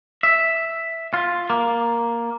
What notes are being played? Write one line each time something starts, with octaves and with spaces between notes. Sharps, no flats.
E5
F4
A#3